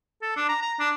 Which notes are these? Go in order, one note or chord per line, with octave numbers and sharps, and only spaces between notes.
A4
D4
A#5
A#5
D4